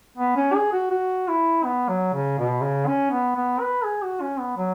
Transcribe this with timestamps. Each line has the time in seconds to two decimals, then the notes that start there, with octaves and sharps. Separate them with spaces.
0.18 B3
0.36 C#4
0.55 G#4
0.73 F#4
0.91 F#4
1.28 E4
1.64 B3
1.89 F#3
2.14 C#3
2.38 B2
2.62 C#3
2.87 C#4
3.11 B3
3.35 B3
3.60 B4
3.84 G#4
4.03 F#4
4.21 C#4
4.40 B3
4.57 F#3